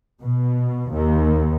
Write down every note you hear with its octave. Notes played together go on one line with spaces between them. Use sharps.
B2
D#2